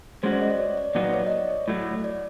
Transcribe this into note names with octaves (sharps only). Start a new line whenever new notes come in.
G#3 C#4 F#4 C5
D5
D#5
D5
C#5
D5
A#2 F#3 B3 D#4 F#4 D5
C#5
D#5
D5
C#5
A2 F#3 A3
D5